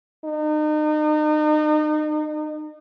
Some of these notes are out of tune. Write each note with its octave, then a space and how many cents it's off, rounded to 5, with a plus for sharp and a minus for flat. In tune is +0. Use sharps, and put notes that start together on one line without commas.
D#4 -35